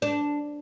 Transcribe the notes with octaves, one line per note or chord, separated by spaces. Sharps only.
D4